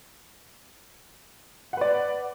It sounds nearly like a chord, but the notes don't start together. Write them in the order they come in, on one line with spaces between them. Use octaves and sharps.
F#5 B4 D5